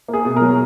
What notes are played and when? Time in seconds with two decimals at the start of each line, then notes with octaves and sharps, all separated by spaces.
0.08 A#3
0.13 G#4
0.25 B2
0.36 F#3 A#4